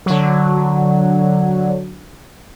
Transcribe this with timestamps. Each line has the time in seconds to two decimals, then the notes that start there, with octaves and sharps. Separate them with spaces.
0.06 D3 F#3